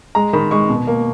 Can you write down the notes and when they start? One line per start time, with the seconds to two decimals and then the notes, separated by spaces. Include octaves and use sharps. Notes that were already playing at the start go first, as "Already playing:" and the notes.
0.15 G#3 A#5
0.33 D#3 B5
0.51 G#3 C#6
0.69 B2
0.87 A#3